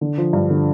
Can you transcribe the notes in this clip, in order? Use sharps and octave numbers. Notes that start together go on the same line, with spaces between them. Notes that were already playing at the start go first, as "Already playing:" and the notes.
D3
F3
G2
D3